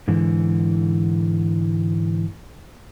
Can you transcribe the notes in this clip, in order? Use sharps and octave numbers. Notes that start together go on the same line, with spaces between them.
G#2 D3 E3